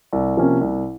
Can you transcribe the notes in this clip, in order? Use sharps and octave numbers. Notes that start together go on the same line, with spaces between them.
C2
C3 F3 A#3 C#4
C2